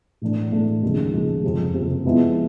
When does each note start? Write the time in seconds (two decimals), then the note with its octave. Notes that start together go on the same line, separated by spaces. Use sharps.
0.21 A2 E3 A3 D4
0.52 A2 E3 A3 D4
0.83 D#2 C#3 F3 G#3
1.13 D#2 C#3 F3 G#3
1.43 F#1 F2 C3
1.74 F#1 F2 C3
2.05 C3 F3 G#3 B3 E4